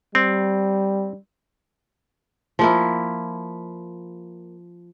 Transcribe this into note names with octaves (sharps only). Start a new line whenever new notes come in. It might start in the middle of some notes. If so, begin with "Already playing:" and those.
G3 C4
F3 A#3 E4